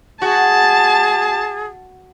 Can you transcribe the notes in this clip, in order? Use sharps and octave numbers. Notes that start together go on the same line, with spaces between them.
F#4 G#4 A5